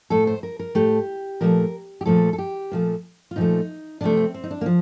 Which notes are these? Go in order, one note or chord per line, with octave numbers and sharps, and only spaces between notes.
A2 A3 A4
C5
A#4
A#4
A2 A3 G4
A#2 F3 A3 A#4
G4
A#2 F3 A3 A4
A4
G4
A#2 F3 A3
F4
A#2 F3 A3 D#4
C3 F3 A3 D4
C4
C4
D#4
D4
A#3
F3